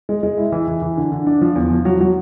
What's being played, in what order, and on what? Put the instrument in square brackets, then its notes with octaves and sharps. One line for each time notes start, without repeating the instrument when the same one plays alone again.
[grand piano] G#3
G#3
E4
E3
E3
E3
D3
D3
D4
F3
E2
F3
F#3
F#3